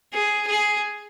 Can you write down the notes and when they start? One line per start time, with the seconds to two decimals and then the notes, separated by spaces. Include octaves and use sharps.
0.13 G#4
0.47 G#4